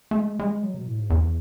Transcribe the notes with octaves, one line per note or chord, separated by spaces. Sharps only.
A3
G#3
G#3
F#3
B2
A2
G#2
E2